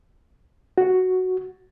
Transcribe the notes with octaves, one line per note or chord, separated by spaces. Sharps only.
F#4